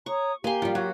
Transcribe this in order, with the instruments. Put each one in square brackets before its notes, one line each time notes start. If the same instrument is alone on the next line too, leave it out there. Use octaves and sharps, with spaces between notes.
[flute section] C#5 A#5 D#6 [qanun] C#6
[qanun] A#3 C6 [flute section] G4 [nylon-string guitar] G#5
[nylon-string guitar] F3 G3 [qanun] F4
[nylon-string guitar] F#3 [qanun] F#4